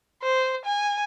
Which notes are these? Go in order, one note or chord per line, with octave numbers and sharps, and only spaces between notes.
C5
G#5